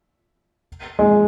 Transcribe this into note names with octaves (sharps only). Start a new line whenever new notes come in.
G#3